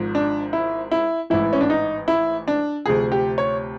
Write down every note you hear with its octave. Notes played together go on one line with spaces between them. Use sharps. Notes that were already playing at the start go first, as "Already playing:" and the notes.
Already playing: G#1 G#2 F3
D4
E4
E4
A1 G#2 E3 E4
C#4
D4
D#4
E4
D4
D2 C3 F3 G#4
G4
C#5